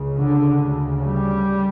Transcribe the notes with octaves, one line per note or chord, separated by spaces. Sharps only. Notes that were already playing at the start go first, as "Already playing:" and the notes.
Already playing: C#2 C#3
D3
D2 C#3
G3